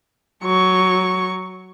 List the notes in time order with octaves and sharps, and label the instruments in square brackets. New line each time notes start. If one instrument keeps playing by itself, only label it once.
[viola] F#3 C#6